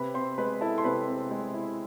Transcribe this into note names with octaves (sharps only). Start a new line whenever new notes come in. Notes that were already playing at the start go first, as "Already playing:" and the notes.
Already playing: C3 B4 B5
C4 C5 C6
G#3 B4 B5
E4 A4 A5
C6
C3 B4 B5
C4
G#3
E4